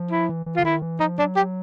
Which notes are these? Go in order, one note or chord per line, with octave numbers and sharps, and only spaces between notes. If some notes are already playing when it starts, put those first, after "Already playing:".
Already playing: F3
E4
E3
E3
F4
D3
D#3 E4
E3
F3 D#4
F#3 D4
G4